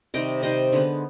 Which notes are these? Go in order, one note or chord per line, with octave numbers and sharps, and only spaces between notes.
C3 D#3 G3 C4 D#5 G5
C3 D#3 G3 C4 C5 D#5
D3 G#3 B3